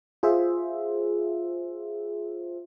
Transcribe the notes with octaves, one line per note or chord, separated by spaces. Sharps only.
F4 G#4 C5 E5